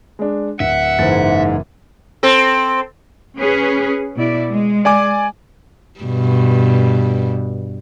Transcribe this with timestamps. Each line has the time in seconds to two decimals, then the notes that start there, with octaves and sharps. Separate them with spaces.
0.19 G#3 D4
0.60 D1 E5 F#5
0.99 F#1 G#2 E3 A6
2.23 C4 A4
3.38 C#4 G#4 B4
4.16 B2 E4 D5
4.51 G#3
4.85 D5 G#5 D6
6.00 G2 B2